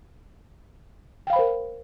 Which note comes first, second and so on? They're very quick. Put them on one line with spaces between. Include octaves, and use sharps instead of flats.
G5 F5 B5 C5 A#4